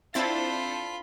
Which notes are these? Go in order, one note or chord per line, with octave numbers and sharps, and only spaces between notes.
C4 D4 E4 F4 A4 C5 B5 A6